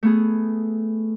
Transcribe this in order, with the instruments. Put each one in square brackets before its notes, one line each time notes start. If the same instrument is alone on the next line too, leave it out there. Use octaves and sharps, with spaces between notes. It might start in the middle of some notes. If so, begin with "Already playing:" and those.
[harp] A3 B3 G#4